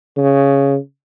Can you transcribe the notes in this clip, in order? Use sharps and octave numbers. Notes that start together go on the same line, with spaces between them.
C#3